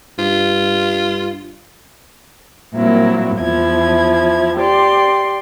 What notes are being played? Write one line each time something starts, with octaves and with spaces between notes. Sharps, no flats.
G2 F4
A#2 F#3 G3 A#3 C4 E4
E2 F3 E4 G#6
G4 D5 C6